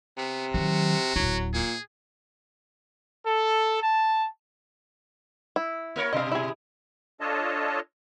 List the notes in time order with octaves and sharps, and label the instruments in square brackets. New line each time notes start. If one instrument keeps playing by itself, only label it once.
[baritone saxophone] C3 [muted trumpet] B3
[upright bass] D#3 F#3 [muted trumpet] F#4
[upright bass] D1 E4 [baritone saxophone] F#3
[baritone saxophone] A#2 [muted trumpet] G#4
[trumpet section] A4
A5
[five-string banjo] E4
[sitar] A#3 A#4 C#5
[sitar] G2 B2 [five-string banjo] D#5 F5
[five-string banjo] E4 G#4
[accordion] D4 F4 A4 C#5 D#5 A5